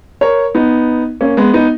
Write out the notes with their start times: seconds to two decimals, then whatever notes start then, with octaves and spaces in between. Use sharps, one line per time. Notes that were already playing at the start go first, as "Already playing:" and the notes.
0.21 A#4 C#5
0.55 B3 D#4
1.21 A#3 C#4
1.37 G#3 B3
1.54 B3 D#4